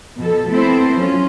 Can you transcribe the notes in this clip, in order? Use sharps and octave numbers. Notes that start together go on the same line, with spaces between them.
B2 F3 A4
A3 B3 C4 E4 A4 C5
F#3 C#4 F4